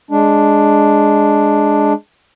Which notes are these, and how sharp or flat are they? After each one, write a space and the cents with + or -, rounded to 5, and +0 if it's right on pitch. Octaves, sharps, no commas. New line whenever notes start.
G#3 +0 D4 +0